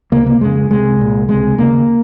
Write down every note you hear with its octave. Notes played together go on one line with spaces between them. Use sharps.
C#2 C3 A#3
A#3
F2 C#3 G#3
C2 C3 G#3
C2 A#2
C#2 C3 G#3
D#2 C#3 A#3